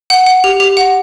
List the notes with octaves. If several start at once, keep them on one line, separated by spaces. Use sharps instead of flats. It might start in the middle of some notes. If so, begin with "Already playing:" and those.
F#5
F#5
G4
G4
F#5